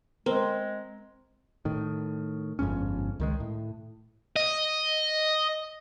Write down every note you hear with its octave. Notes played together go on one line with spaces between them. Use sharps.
G#3 C4 A#4
A2 D#3
G1 F2 G#2 C#4
C#2 D#3 G#3
A2
D#5